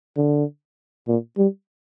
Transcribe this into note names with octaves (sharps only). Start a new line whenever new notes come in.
D3
A#2
G3